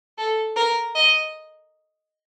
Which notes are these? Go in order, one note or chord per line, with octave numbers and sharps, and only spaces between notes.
A4
A#4
D#5